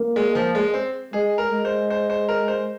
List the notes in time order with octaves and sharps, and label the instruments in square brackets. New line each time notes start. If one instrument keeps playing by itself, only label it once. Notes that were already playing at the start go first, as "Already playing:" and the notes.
Already playing: [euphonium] A#3
[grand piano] G#3
F3
G#3
C4
[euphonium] G#3 [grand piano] G#4
[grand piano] A#4
[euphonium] G#3
[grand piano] C5
C5
C5
A#4
C5